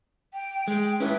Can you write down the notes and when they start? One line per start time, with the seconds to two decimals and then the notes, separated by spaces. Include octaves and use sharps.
0.33 G5
0.68 G#3 G5
1.00 C#4 E4 B4